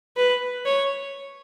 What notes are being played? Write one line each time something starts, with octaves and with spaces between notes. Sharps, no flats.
B4
C#5